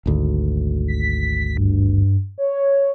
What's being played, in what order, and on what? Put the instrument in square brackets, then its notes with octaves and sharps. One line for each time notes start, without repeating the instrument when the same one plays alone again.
[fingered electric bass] G#1 D2
[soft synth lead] B6
G2
C#5